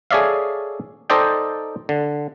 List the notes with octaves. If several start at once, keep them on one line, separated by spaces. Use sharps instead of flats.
G#4 A4 C#5 D5 E5 F5
D#4 A4 C5 D5 D#5 G5
D3